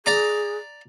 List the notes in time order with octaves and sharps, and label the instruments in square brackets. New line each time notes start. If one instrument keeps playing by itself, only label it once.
[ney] G#4 [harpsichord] D5 A#5 D6